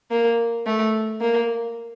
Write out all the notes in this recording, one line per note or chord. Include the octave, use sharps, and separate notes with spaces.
A#3
A3
A#3